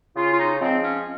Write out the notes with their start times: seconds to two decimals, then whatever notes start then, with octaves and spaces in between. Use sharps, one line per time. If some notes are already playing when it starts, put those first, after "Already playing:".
0.16 C#3 F4
0.33 F4
0.38 D#4
0.60 F3 G#3 C4
0.83 C#4